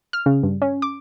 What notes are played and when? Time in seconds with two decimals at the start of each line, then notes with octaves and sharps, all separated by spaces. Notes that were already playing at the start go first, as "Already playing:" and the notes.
0.13 F6
0.26 C#3
0.43 G2
0.62 C#4
0.82 D6